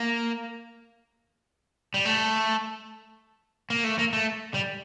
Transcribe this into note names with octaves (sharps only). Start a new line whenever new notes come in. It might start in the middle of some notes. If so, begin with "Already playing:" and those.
Already playing: A#3
G3
A3
A#3
A3
A#3
A3
G3